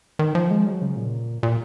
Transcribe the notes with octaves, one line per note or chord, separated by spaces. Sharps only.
D#3
F3
G#3
F#3
C#3
A#2
A#2